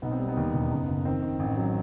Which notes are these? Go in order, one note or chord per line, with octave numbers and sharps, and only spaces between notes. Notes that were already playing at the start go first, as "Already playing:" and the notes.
B1 B3 D#4
C4
G3
B3 D#4
D#2
E1
F#1
F#1
D#3 C4
D#3
A1
F#3